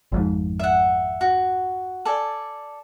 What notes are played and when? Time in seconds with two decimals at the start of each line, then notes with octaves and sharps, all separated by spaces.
0.12 G#1 F2 G#2
0.59 E5 F#5
1.21 F#4
2.05 A4 D5 G#5